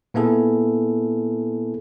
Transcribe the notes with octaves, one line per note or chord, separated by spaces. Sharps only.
A#2 A#3 B3 E4 G#4 A4